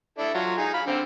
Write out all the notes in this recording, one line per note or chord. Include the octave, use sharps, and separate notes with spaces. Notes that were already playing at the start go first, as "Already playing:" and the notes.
D4 E4 A4
F#3 F4
D#4 G#4
F5 B5
D3 C4